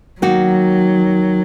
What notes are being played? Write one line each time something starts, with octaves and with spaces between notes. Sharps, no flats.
D#3 F#3 A#3 D#4 F#4